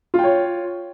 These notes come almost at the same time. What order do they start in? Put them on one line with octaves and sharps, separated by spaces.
F4 G5 C#5